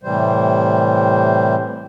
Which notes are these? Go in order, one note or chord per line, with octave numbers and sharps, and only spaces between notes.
A2 C3 E3 G3 C5